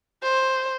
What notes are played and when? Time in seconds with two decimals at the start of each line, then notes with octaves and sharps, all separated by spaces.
0.23 C5